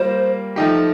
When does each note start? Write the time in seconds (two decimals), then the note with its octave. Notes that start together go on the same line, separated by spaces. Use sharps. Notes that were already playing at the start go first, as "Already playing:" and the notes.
Already playing: G3 A#3 F4 A#4 C5
0.56 F3 A3 D#4 G4